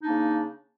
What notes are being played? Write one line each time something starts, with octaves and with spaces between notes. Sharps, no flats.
C#3 A#3 D4 D#4